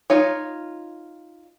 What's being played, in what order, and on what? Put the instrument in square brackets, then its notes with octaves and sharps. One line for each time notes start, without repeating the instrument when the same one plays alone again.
[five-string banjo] D#4 F4 C#5